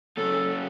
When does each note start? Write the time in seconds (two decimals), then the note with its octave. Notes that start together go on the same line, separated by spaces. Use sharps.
0.17 C#3 F#3 A#3 C#4 A4